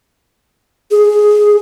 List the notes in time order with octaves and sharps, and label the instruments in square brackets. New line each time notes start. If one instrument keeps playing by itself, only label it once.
[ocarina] G#4